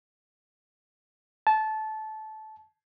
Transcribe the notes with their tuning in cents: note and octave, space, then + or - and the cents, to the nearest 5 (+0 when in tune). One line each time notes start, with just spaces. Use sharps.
A5 -20